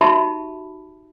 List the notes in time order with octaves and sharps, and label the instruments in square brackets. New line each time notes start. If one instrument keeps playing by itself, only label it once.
[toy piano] D#4 F#4 G4 E5 A5 B5